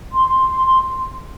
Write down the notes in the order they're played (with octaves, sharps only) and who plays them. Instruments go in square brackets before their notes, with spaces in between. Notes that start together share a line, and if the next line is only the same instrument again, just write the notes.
[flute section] C6